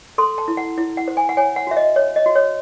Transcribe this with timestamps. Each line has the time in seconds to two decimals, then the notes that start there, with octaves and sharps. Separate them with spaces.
0.18 A4 C6
0.38 A5
0.48 E4
0.57 F#5
0.78 E4
0.97 F#5
1.08 C5
1.17 G#5
1.29 F#5
1.37 C#5 G#5
1.56 F#5
1.67 F#4 E5
1.77 D#5
1.96 C#5
2.16 D#5
2.26 F#4
2.35 C#5